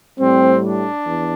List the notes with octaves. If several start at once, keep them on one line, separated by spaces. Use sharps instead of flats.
A2 G3 C4
D4
E2